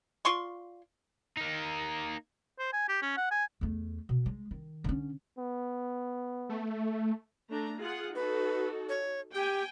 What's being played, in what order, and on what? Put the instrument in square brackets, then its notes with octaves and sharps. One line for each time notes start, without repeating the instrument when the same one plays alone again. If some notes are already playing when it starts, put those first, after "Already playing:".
[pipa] F4 D5 C6 C#6
[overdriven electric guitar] A#3 D#4
[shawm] C5
G#5
G4
C#4
F#5
G#5
[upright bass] E2 A3
B2
G#3
D#3
D3 C#4
[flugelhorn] B3
[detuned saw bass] A3
[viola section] A3 D4 A#5
F4 G#4 F#5
[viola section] D#4 F#4 A4 [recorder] B4
[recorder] C#5
[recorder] G4 [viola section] G5 G#5